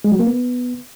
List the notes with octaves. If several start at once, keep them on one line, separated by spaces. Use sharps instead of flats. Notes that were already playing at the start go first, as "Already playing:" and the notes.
G#3
F#3
A#3
B3